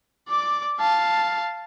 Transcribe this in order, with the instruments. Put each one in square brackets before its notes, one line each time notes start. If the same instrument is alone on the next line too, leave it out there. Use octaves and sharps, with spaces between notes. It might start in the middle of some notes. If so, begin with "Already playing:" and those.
[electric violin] D5 D6
F5 A5